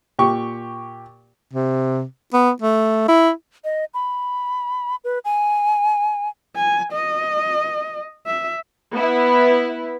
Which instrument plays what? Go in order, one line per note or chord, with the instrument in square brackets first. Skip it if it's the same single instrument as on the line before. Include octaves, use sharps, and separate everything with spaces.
[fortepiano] A#2 G4 C#6
[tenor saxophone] C3
B3
A3
E4
[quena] D#5
B5
B4
G#5
[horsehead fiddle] G#5
D#5
E5
[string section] B3 E4